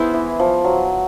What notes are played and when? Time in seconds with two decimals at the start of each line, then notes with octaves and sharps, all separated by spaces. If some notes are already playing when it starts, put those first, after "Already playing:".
Already playing: B3 E4 G#4 C5
0.14 E3
0.40 F3
0.64 F#3